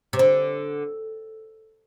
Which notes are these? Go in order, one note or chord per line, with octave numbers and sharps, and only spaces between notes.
C3
D3